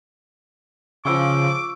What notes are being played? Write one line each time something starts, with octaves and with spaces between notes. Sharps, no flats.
C#3 F3 C#6 D6 E6 D7